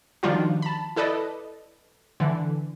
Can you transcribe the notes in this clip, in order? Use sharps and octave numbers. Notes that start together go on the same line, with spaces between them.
D#3 F3 G3 D4 F4 F#4
A5 B5
E4 A4 B4 D5 D#5
D3 E3